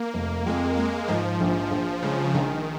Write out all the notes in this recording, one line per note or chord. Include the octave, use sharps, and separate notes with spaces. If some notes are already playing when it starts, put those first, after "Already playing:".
Already playing: A#3
F1
F2 G#3
G#3 A#3
G#2 F3
A#1
A#1
C#3 G#3
A#1 D#3